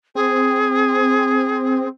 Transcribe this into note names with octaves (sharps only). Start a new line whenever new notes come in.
C4 G#4